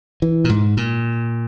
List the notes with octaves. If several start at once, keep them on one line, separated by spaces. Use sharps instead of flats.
E3
A#2
G#2
A#2